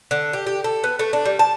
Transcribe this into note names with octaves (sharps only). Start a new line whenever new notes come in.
D3
G4
G4
A4
B3
A3
D4
G3
A5